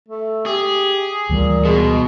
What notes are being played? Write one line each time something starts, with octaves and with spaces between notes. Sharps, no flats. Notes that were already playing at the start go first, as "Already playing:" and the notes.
A3
G4 G#4
D2 A#2 E3 G3
B2 G#3